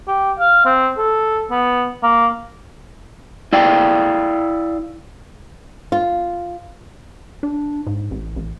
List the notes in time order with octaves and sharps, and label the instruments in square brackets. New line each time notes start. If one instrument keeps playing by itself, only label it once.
[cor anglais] G4
F5
C4
A4
B3
A#3
[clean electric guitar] E4 D5 F5 G5
[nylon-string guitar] F4
[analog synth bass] D4
G#2
A1
A1